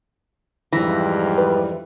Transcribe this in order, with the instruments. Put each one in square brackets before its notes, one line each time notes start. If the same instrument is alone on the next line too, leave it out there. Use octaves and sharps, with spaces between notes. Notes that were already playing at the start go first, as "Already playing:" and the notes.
[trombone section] F2 G#2 G3 [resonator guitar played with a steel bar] E3 [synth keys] A#6
[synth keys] B4